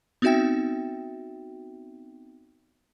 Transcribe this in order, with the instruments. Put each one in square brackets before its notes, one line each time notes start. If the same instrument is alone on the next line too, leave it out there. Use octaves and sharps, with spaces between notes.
[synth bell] B3 C4 D#4 F#4 E5 G5